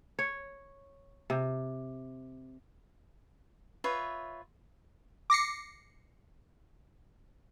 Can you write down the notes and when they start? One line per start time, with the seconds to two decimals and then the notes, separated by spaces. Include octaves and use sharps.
0.19 C#5
1.30 C3
3.84 F4 B4 C#5 E5
5.30 D6 A#6 C7 C#7